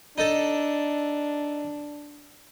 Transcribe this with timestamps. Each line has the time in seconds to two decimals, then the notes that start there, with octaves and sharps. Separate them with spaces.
0.18 D4 D#4 A4